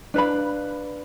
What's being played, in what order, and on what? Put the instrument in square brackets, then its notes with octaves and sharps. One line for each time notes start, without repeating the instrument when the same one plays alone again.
[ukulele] D4 B4 F5 B5